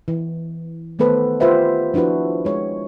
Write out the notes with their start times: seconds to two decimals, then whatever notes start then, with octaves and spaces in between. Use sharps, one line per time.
0.08 E3
0.99 D#3 A3 B3 A4 B4 C5
1.40 F4 G4 B4 C5 E5 F#5
1.94 F3 D4 E4 F#4 B4
2.45 G#3 C#5